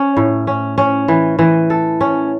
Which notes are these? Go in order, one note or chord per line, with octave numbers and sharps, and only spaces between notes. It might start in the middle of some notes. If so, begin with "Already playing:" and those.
Already playing: C#4
A2
C#4
C#4
E3
E3
A4
C#4